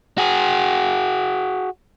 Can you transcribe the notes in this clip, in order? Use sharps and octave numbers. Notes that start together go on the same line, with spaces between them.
F#4 G#4